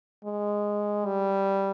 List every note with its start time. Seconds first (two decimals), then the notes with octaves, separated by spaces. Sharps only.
0.25 G#3
1.05 G3